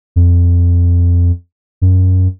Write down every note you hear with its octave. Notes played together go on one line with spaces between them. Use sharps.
F2
F#2